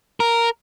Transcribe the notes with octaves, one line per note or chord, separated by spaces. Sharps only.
A#4